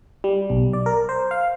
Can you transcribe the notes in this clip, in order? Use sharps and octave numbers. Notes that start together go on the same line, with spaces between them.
G3
B1
D5
A#4
C5
F5